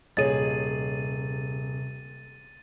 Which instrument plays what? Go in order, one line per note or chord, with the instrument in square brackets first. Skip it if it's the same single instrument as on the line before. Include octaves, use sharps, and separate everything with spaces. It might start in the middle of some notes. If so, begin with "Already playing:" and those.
[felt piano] D#1 G#4 [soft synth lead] C3 [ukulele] C#5 D#5 [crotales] A6 D#7